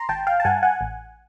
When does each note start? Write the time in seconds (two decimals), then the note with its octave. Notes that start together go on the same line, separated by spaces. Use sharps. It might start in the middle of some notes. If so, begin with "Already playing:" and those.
Already playing: A#5 C6
0.09 G#1 G5 A5
0.27 F5 G5
0.40 A5
0.45 G2 F#5 G#5
0.63 F#5 G#5
0.81 A1